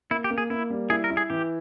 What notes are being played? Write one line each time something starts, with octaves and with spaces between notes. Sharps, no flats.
A#3 E4
G4
A#3
G#4
A#3 E4
G3
E4 G#4
A#4
E4
G#4
E3 G4